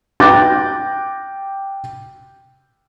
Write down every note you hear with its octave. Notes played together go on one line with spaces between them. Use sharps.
G5 D6 F#6 G6 A6 A#6